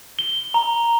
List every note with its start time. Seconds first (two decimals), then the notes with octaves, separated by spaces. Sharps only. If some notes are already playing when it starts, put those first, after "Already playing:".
0.19 G7
0.54 A#5